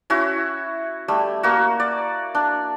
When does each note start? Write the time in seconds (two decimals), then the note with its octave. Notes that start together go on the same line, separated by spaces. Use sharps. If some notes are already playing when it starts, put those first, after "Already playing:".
0.10 C#4 E4 F#4
1.08 G3 A3
1.43 A#3 F#4
1.80 D5
2.35 D4